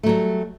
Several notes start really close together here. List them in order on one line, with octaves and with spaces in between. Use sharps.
A3 F#3 G3